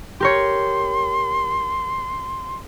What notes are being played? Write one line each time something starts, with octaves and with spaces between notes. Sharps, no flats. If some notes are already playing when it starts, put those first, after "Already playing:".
G4 A#4 C#5 C6